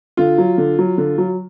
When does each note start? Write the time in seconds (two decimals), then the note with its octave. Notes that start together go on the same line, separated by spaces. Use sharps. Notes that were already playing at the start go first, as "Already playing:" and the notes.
0.17 D3 F4
0.38 F#3
0.58 D3
0.79 F#3
0.98 D3
1.18 F#3